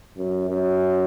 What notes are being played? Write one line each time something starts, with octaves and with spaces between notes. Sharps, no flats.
F#2
F#2